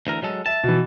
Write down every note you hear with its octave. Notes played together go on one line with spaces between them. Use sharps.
D2 E3 A#4
F#3 G#3 A4
E5 A5
B2 E3